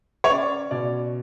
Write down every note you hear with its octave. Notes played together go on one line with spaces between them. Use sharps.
C#5
C#4 D5
B2 D5